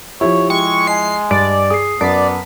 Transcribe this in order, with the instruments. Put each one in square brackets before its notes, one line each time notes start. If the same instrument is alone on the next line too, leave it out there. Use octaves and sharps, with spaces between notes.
[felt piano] F3 E4 [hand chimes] G4 [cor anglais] C#5
[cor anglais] G#3 [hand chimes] G5 [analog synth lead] C#6
[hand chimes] D#5 G#5 [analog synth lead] C7
[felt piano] G2 [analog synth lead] D5
[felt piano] G#4 [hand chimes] D#6 C7
[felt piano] F#2 [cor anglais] B3 [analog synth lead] D5 [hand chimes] A5 B6